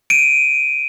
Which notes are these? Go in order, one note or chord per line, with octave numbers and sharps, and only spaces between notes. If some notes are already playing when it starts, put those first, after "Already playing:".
D7 D#7